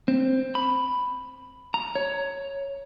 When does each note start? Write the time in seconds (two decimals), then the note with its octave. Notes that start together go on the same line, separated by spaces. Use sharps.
0.08 C4
0.55 B5
1.74 A#5
1.95 C#5